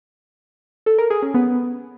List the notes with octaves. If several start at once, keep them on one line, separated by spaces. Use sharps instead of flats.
A4
A#4
G#4
C#4
B3